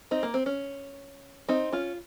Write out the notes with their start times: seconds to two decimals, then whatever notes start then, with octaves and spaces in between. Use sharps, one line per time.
0.11 C4 D#4
0.23 A#3
0.34 C4
0.46 C#4
1.49 C4 D#4
1.72 C#4 F4